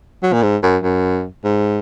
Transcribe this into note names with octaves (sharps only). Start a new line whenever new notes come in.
F#3
A#2
G#2
F#2
F#2
G#2